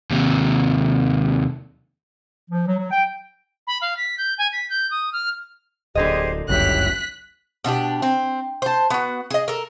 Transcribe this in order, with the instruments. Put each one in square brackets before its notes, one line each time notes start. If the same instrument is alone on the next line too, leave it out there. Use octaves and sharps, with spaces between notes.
[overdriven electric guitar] D#2 C3
[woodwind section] F3
F#3
F#3
G5
[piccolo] B5
F5
B6
G6
G#5
B6
G6
D#6
F6
[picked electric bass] D1 [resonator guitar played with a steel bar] D3 A#3 D#5 [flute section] G4 G#4 C5
[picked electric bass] G1 C#2 F#2 [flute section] E4 G4 C#5 [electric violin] F#6 B6
[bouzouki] B2 D4 E4 G4
C4
C5 A5
B3 F#4
G#4 D#5
A4 A#4